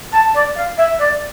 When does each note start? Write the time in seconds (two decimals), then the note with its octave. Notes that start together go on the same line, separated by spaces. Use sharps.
0.13 A5
0.34 D5
0.56 F5
0.77 E5
0.99 D5